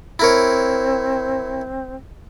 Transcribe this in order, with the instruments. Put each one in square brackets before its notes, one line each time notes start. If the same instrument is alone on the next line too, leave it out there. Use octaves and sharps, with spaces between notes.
[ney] C4 [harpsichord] E4 A#4 C#5